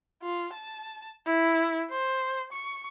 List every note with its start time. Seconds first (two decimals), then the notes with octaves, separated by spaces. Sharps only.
0.23 F4
0.53 A5
1.26 E4
1.90 C5
2.52 C#6